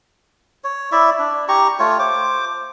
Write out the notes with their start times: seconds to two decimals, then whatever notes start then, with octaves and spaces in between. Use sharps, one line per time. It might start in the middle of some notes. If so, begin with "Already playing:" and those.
0.64 C#5
0.92 E4 D5 E5
1.19 D4
1.48 G4 A#5 C#6
1.80 A3 F4 C#5
1.99 C5 D6